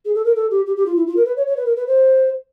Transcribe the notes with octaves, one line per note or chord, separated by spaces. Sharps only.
G#4
A4
A#4
A4
G4
G4
G4
F4
E4
F4
A#4
B4
C#5
C#5
B4
A#4
B4
C5